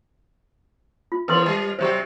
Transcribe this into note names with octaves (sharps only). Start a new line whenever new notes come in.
F4
E2 A#4 B4 C#5 C6
G3
C3 F#3 G4 C5